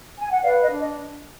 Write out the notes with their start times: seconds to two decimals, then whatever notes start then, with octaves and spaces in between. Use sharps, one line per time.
0.19 G#5
0.31 F#5
0.43 B4 D5 F5
0.62 D#5
0.70 D4
0.80 D#5